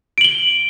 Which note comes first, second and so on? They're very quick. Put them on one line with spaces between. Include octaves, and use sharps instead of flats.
D7 F#7 G7